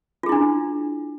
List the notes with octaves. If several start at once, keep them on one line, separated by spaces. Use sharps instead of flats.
D4 E4 F4 G#4